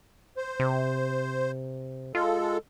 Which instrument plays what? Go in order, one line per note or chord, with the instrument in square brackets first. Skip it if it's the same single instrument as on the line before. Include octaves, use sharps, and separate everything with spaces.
[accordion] C5
[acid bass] C3
[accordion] G#3 A4 [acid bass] F4